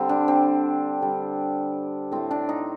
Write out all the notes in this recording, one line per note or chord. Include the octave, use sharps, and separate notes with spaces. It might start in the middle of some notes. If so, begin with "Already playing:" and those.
Already playing: D3 G3 C4
D4
C4
D3 G3
A2 A3 C4
D4
D#4